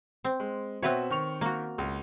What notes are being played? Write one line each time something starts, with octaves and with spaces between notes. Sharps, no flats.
C4
G#3
B2 C4 F#4 B4 C#5 E5
D#3 C#6 F7
A#3 F#4
C#2